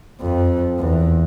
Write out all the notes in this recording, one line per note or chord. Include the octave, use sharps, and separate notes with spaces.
F2
E2